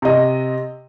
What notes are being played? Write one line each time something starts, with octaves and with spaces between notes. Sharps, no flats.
C3 D#5